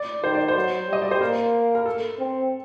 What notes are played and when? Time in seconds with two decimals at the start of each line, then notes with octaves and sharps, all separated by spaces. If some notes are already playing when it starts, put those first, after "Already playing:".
Already playing: D5
0.23 D#3 C5
0.35 D5
0.48 C5
0.55 F#3
0.88 G3 D#5
1.02 D5
1.11 C5
1.20 A#3 A#4
1.75 A#4
1.86 A4
2.19 C4